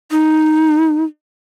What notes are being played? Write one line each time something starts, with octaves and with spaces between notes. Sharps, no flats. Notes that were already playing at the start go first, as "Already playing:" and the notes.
D#4